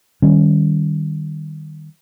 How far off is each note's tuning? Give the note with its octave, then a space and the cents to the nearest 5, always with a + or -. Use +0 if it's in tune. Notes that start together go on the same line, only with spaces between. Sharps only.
D#3 -15 G3 +0 C#4 +0